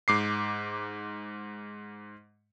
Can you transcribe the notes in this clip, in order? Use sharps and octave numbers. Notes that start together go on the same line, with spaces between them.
G#2 D6 C7